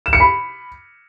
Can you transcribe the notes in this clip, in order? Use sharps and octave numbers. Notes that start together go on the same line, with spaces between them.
E7
C#7
B5